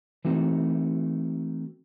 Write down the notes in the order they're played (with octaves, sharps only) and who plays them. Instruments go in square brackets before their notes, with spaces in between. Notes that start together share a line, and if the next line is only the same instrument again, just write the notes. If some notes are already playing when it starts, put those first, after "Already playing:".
[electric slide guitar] E3 A3 C4 D#4 F#4